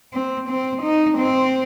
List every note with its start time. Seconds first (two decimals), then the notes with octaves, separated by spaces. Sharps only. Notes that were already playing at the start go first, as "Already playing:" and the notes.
0.13 C4
0.49 C4
0.83 D#4
1.18 C4